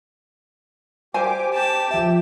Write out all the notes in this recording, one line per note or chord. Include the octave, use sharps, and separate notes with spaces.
G4 C5 G#5 D6
G4 G5 A5
F3 E5